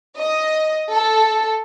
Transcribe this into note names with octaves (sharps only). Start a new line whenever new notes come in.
D#5
A4